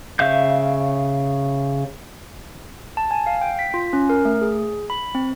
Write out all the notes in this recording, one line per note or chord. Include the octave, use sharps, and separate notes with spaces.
C#3 E5 F5 G6
A5
G#5
F5
G5
B6
F4
C#4
A#4
A3
G#4
B5
C4